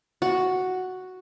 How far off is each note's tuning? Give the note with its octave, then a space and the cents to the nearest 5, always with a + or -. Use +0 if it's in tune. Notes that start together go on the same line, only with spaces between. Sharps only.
F#4 +0 F#5 +0